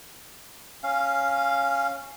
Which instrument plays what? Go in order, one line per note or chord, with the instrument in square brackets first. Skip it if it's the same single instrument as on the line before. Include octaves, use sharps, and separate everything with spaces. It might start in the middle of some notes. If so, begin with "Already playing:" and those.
[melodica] C#4 F5